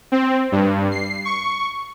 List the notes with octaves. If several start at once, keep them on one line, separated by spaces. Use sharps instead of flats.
C4
G2
C7
C#6